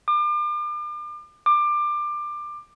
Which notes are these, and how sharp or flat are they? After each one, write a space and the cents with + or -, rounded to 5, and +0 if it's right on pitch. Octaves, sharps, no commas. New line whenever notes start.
D6 +35
D6 +20